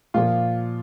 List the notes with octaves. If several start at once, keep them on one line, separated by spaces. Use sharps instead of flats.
A#2 F3 A#3 F4